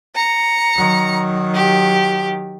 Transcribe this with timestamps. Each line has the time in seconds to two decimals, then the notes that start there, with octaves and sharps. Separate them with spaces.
0.15 A#5 C#7
0.75 D#3 F#3
1.54 G4